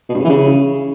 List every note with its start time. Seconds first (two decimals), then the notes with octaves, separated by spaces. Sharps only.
0.09 B2
0.14 G2
0.19 C#3
0.24 E3
0.29 C#3